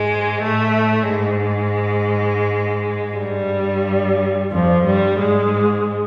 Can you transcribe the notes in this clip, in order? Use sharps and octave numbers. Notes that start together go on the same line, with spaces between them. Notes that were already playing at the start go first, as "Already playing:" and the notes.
Already playing: G#2 G#3
A2 A3
G#2 G#3
G2 G3
F2 F3
G2 G3
G#2 G#3